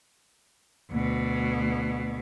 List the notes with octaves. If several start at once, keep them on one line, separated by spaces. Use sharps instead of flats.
D2 B2